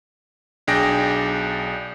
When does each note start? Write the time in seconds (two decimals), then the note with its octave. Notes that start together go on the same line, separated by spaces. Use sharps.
0.67 B1 D4 G#4 D5 G5 A#6